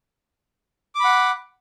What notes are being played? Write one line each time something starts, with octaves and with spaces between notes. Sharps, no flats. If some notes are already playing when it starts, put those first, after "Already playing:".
F#5 B5 D6